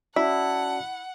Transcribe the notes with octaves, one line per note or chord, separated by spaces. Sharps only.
C#4 E4 F#4 D5 F#5 A5